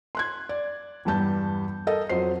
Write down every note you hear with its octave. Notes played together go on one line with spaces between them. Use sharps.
C6 F#6 G#6
D5
E2 G2 G3 A5 G6
A4 A#4 D#5
F2 F#3 C5 C7